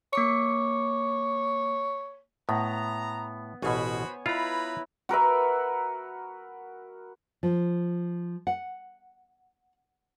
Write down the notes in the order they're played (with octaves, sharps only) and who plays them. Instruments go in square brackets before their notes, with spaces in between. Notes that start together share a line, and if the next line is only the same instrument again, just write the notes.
[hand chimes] A#3 D6 C#7 [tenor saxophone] C#5
[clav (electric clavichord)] A2 [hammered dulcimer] B3 [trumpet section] A#5
[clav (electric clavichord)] A1 B2 [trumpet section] F#4 C5 B5 [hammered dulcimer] C#5 G#5
[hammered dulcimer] E4 [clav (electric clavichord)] F4 [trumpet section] B4 A#5 B5
[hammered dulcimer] F#4 A#4 B4 E5
[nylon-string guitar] F3
F#5